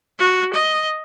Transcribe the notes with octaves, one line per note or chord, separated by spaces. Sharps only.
F#4
D#5